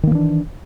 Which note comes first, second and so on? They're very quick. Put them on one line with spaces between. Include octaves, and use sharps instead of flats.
D#3 A#3 E3 D4